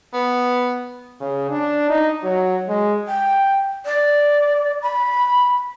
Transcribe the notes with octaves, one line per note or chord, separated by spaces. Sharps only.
B3
C#3
D4
D#4
F#3
G#3
G5
D5
B5